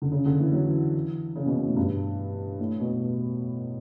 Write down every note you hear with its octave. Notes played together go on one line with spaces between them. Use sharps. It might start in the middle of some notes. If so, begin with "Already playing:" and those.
D3
C#3
D3
E3
F#3
E3
C#3
B2
B2
A2
G2
A2
B2